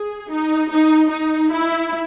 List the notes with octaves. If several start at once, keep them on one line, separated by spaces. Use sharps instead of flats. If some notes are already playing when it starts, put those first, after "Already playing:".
Already playing: G#4
D#4
D#4
D#4
E4